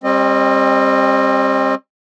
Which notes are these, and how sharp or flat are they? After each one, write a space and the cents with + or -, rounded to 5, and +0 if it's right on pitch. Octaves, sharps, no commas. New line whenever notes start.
G3 +25 C4 +30 D#5 -20